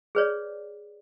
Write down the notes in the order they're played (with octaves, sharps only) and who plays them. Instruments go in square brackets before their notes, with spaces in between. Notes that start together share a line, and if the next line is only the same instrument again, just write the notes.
[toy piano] G#4 B4 C#5 D5